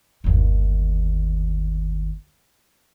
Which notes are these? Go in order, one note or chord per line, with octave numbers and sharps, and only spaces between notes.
G1 D#2